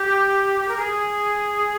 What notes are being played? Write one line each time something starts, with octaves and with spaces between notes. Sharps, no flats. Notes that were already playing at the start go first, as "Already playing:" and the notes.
Already playing: G4
A#4
G#4